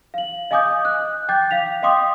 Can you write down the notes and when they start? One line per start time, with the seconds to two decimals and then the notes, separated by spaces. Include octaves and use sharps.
0.14 F5 F#7
0.51 D#5 F5 G#5 D6 D#6 G6
0.85 F#6
1.29 G5 D6 G6 A6
1.51 F5 B6 F7
1.82 D#5 F5 G5 C6 D6 D#6